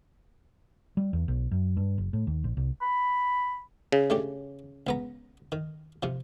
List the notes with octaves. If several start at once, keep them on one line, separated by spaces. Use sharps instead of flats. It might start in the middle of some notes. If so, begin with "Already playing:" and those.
G3
E2
B1
F#2
G2
F#1
A2
D#2
A#1
C2
B5
C#3 G#4
A3 D4 G4 C#5
C#2 B3 A#5
D#3
C3 F3